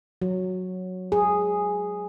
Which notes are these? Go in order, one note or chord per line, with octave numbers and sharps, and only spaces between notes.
F#3
G#4